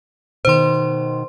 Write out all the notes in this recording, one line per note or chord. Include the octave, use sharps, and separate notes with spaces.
B2 D#3 C5 C6